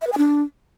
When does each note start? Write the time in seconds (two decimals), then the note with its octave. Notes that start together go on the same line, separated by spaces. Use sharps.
0.02 E5
0.07 B4
0.12 G#5
0.18 D4